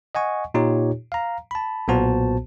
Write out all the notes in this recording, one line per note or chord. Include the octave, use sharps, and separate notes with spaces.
D#5 F#5 G#5 C#6
A#2 D#4 F4 G4 C#5
F5 A#5
A5 B5
B1 A#2 B3 F#4 C5 A5